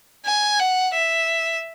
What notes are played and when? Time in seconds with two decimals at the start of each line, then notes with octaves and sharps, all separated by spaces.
0.26 G#5
0.60 F#5
0.94 E5